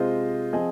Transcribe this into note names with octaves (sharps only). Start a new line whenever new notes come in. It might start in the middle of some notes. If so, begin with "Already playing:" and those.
Already playing: C3 G#3 F4 C5 D#5
F3 C4 G#4 D#5